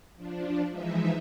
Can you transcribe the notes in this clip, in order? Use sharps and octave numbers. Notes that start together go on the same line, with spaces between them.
F3 D4
E3 F3 G#3 D#4 E5